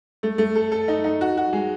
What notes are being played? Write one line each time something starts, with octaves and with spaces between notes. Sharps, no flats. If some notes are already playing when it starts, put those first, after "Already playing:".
A3
A3
A4
A4
D#4
D#4
F#4
F#4
G#3